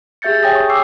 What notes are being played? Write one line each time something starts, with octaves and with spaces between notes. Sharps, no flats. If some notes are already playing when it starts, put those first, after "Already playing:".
G4 G#4 E5 G6 A6 C#7
C#5 G5 G#5 D#6 A#6
C#6
D6 E6 C7